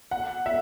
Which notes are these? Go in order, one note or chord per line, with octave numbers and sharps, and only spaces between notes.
F#5
E5